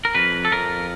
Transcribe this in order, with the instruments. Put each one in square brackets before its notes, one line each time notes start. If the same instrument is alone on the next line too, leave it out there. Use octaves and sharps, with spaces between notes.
[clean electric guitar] A#4
F2 B4
A4
F2 A#4